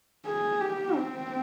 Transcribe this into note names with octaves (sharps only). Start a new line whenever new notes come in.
G#4
G4
C4